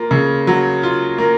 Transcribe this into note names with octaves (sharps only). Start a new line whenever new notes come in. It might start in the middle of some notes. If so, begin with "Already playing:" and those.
Already playing: A#3 F4
C#3
F#3
F4
A#3